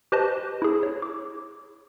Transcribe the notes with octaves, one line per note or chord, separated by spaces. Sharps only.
G4 B4 C5 D#5 A5
E4 G#4
C#5
D6